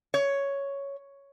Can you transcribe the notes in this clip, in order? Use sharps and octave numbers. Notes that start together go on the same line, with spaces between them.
C#5